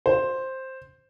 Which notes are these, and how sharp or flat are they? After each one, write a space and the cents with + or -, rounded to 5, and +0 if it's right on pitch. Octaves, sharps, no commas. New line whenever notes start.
C5 +5